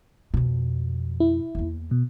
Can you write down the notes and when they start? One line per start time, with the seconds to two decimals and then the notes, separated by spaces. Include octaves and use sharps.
0.34 F2 B2
1.20 E4
1.55 E2 A#3
1.91 B2